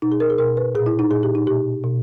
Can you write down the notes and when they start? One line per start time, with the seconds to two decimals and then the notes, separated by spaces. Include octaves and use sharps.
0.02 B2 D#4
0.12 G#4
0.20 A#4
0.30 G#4
0.38 B2 A#4
0.57 B4
0.75 A#2 G#4
0.86 E4
0.99 D#4
1.10 A#2 G#4
1.23 G4
1.35 D#4
1.47 B2 G4
1.84 B2